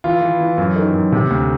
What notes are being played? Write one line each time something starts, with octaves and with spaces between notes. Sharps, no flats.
E3 F4
E3
E3
F#2
D#3
F#2
C3
D2